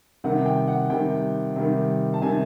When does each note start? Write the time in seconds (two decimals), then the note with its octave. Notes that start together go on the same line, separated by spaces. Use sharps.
0.24 C3 D#3 G3 F#5
0.46 G5
0.68 F#5
0.90 C3 D#3 G3 G5
1.56 C3 D#3 G3
2.14 A5
2.22 C3 D#3 G3 G#5